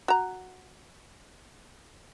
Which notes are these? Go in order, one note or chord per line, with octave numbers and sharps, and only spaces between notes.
F#4 A#5